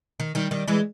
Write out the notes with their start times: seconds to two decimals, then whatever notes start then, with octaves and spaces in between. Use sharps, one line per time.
0.20 D#3
0.35 D#3 G3
0.51 D#3 G3
0.68 E3 G#3